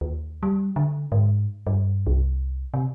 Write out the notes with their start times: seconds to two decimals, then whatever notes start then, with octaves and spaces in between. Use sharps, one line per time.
0.01 D#2
0.43 G3
0.76 D3
1.12 G#2
1.67 G2
2.07 C2
2.74 C3